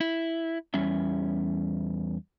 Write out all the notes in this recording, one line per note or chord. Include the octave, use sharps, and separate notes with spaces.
E4
E2 G3 C#4 E5